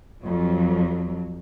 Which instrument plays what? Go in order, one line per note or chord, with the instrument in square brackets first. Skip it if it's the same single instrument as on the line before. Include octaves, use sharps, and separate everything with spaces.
[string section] F2 F#3